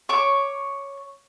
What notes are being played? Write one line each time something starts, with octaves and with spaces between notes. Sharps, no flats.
C#5 C#6 D6